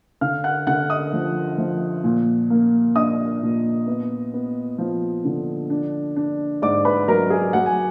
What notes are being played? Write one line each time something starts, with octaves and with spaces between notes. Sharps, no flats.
D3 F5 F6
F#5 F#6
D3 F#5 F#6
D#5 D#6
F3
F3
A#2
A#3
D4 D#5 D#6
A#2
B3
B3
F3
D3
D4
D4
G#2 D5 D6
B4 B5
F#3 A#4 A#5
G#4 G#5
F#3 F#5
G#5